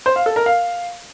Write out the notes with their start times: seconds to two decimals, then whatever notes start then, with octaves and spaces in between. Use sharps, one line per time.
0.06 C5
0.16 F5
0.26 A4
0.36 A#4
0.46 F5